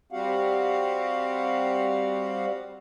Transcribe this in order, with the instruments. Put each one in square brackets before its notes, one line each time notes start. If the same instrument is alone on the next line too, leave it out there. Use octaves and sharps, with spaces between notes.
[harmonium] G3 C4 F#4 G4 F5 F#5